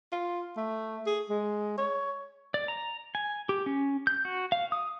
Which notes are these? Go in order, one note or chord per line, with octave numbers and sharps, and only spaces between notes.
F4
A3
G#4
G#3
C#5
D5
A#5
G#5
G4
C#4
G6
F#4
F5
D#6